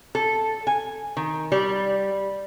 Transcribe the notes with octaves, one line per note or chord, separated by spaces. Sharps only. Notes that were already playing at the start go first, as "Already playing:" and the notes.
A4
G#5
D#3
G3